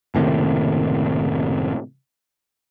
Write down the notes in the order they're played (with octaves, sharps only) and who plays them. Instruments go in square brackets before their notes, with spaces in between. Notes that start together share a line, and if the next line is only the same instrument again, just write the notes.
[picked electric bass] F#1 A2 C3 D#3